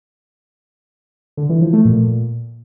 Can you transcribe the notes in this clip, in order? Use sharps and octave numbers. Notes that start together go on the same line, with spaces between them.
D3
E3
F3
A3
A#2